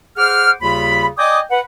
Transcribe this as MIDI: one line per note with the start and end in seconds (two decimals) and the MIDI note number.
0.17 0.51 68
0.17 0.51 72
0.17 0.51 78
0.17 0.51 86
0.17 0.51 89
0.62 1.07 39
0.62 1.07 49
0.62 1.07 55
0.62 1.07 65
0.62 1.07 83
1.18 1.40 74
1.18 1.40 75
1.18 1.40 79
1.18 1.40 80
1.18 1.40 86
1.18 1.40 87
1.51 1.60 71
1.51 1.60 78